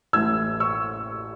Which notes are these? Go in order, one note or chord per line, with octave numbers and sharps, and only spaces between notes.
A1 A2 E3 A3 E6 G#6
C#6 E6